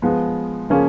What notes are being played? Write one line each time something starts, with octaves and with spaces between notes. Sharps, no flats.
F3 G#3 B3
C#3 F3 A#3 C#4